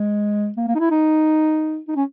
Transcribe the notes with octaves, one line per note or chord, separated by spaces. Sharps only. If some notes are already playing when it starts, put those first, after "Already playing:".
Already playing: G#3
A#3
A#3
D#4
E4
D#4
D#4
C#4